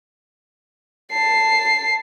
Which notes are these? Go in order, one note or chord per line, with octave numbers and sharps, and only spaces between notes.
A5 C7